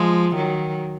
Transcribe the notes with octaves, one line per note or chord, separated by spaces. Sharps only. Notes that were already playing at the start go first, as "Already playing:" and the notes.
Already playing: F3 G#3
D#3 F#3